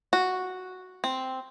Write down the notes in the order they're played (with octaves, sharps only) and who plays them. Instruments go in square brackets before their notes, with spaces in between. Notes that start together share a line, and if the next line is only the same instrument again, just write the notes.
[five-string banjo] F#4
C4